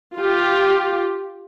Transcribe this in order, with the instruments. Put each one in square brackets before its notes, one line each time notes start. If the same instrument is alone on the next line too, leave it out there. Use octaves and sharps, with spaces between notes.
[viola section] F4 G4